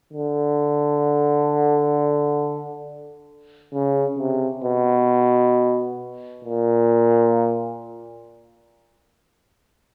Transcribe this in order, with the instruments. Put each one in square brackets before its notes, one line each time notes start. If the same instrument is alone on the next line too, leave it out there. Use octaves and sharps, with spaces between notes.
[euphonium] D3
C#3
C3
B2
A#2